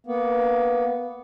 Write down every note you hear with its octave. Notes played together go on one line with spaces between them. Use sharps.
A#3 B3